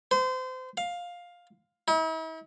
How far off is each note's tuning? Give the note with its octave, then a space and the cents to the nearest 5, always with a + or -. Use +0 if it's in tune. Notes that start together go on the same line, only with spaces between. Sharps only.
C5 -30
F5 +10
E4 -45